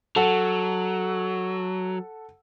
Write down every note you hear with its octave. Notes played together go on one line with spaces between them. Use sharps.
F#3 A4 F#5